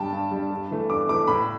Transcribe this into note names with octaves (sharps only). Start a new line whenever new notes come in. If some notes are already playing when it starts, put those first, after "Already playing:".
Already playing: G2 G3 D4 G5 A5
G2
G3
D4
G2
E3 A3
G2 D6
E3 A3 D6
A2 B5